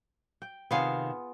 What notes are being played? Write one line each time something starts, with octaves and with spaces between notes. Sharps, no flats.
G5
C3 D#3 B3 F4 G#4 F5